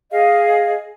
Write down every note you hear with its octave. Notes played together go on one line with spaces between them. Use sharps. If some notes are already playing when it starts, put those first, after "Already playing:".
G#4 D#5 F5